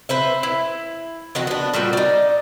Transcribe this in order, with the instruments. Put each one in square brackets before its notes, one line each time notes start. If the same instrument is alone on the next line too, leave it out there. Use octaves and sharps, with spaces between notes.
[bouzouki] B4 C5 E5
E4
D#3 F3 F#4
B3 D4
A#2 G3 F#4 G5
D#4 D5